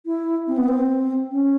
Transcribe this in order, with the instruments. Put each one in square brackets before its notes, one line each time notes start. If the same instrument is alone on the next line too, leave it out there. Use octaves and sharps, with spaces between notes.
[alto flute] E4
C4
B3
C4
C#4